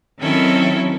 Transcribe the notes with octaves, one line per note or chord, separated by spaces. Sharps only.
D#3 F#3 C4 C#4 E4 A4